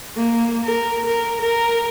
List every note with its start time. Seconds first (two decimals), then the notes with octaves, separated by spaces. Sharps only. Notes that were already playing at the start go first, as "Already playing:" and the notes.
0.16 A#3
0.64 A#4
1.06 A#4
1.42 A#4